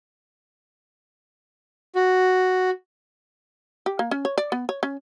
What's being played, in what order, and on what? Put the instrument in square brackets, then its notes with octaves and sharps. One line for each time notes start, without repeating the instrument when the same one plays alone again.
[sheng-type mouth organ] F#4
[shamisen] G4
A#3
C#4
C#5
D5
B3
C#5
C#4